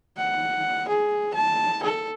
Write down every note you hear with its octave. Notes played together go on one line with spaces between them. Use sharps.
F#5
G#4
A5
A4